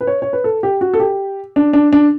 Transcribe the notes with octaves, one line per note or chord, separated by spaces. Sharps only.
B4
C#5
C#5
B4
A4
G4
F#4
A4
G4
D4
D4
D4